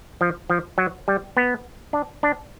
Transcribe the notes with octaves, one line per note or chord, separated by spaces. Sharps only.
F3
F3
F#3
G3
B3
D4
D4